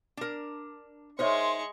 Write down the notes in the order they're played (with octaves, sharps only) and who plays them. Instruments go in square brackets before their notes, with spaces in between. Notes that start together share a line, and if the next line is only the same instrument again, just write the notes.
[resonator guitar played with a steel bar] D4 A#4
[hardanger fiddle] G#3 C#6 [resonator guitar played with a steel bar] D#4 A#4 C#5 [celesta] C5 E5 [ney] C6